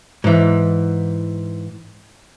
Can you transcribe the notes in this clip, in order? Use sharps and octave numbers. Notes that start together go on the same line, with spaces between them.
G#2 E3